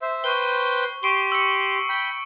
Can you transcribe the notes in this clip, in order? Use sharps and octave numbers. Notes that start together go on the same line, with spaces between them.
C5 E5
B4 C5 G5 C#6 G7
G4 C6 C#6 D7 G7
E6 C#7
G5 B5